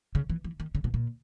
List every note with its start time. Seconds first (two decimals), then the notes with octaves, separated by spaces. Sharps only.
0.15 C#3
0.30 E3
0.44 E3
0.60 D#3
0.75 C#3
0.84 B2
0.94 A#2